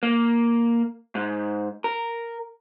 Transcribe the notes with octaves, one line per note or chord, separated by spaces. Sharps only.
A#3
G#2
A#4